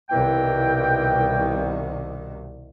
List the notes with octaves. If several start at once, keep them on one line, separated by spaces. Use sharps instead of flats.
C2 B2 D#3 E3 A#4 G5